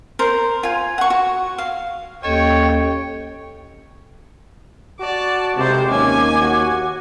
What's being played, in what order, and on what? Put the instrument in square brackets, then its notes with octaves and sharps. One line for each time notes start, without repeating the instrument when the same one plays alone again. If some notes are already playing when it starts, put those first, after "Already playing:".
[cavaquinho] A#4 C5
F4 G#5
F#5 C#6
F#4
F5
[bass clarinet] D#2 [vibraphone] C#4 A4 D#5 [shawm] C#5 [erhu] G5
[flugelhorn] F#4 [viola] D5 A5
[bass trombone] C3 [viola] G#3 C5 [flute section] D6
[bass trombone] D#2 [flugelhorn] C#4 [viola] G#5
[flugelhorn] F#4